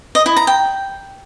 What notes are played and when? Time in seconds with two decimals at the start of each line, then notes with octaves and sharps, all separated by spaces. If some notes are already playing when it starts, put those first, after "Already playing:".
0.15 D#5
0.26 E4
0.37 A#5
0.47 G5